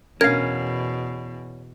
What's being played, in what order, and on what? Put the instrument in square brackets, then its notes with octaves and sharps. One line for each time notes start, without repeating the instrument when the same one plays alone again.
[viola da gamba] E2 B2 [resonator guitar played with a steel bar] C#4 [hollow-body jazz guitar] A#4 F5 [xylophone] G#6